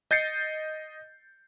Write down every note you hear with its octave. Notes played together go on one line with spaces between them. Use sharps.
D#5 G6 A6 C7 C#7